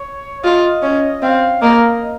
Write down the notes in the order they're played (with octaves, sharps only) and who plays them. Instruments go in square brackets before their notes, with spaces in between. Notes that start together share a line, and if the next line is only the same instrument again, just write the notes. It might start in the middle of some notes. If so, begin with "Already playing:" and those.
Already playing: [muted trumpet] C#5
[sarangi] F4 [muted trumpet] D#5
[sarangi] C#4
[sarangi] C4 [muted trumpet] F5
[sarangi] A#3 [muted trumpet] D#5